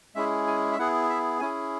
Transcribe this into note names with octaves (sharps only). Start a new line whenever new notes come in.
G#3 C#4 E4 G#4 E5
G#5
E5
B3 E4 G#4 F#5
E5
C#4 E4 G#4 G#5